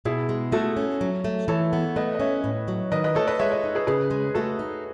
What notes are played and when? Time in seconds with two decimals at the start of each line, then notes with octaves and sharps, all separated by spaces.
0.05 B2 E4 G#4
0.29 G#3
0.52 A3 F#4 A4
0.77 C#4
1.01 F#3
1.24 A3
1.48 E3 A4 C#5
1.73 B3
1.96 A3 B4 D#5
2.15 D#5
2.19 C#4 C#5 E5
2.44 A2
2.68 F#3
2.92 D#3 B4 D#5
3.04 B4 D#5
3.15 A3 A4 C#5
3.27 B4 D#5
3.40 G#3 C#5 E5
3.51 B4 D#5
3.64 D#4
3.75 G#4 B4
3.87 C#3 G#4 B4
4.11 G#3
4.35 A3 F#4 A4
4.59 D#4